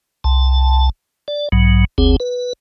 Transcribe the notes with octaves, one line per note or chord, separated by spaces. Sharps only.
C2 A5
D5
B1 G#2 F#3
F#1 D2 C4 G#4
B4